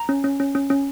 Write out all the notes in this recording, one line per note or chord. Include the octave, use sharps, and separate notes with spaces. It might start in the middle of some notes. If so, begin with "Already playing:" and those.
Already playing: A#5
C#4
C#4
C#4
C#4
C#4